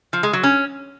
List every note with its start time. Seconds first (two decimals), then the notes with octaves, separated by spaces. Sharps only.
0.13 F3
0.23 G#3
0.33 F#3
0.43 C#4